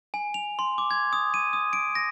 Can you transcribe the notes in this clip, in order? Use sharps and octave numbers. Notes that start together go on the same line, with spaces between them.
G#5
F7
C6
D6
G#6
D#6
D#7
D#6
D7
A#6